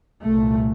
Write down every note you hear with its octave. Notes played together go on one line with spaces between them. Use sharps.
C2 A#2 A3